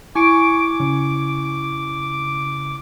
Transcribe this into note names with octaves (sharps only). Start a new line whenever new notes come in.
E4 G#5 C#6 D6 D7
C#3